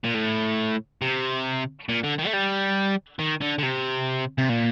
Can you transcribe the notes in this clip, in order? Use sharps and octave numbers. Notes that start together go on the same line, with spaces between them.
A#2
A2
C3
A#2
D3
D#3
A3
G3
D#3
D3
D3
C3
C3
A#2